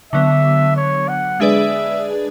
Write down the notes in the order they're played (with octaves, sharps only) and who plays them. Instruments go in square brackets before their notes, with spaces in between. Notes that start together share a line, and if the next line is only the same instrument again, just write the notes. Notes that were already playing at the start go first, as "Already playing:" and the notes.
[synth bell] D3 F#3 B3 [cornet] E5
[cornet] C#5
F#5
[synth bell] G#3 D4 G#4 B4 D5 [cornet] E5